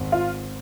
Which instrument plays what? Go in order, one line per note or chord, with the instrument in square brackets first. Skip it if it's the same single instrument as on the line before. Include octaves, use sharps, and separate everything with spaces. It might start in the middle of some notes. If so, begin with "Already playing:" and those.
Already playing: [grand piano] G#1
[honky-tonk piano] F4